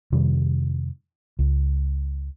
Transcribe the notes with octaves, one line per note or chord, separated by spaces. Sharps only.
F2 C3 D#3 G3
C#2